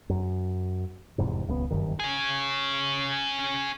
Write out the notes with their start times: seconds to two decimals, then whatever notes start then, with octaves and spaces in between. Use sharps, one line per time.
0.10 F#2
1.18 F1 E2 G#2 C3
1.47 D#1 C#2 D#3 B3
1.71 F#1 G2 D#3
2.00 C#4 G#4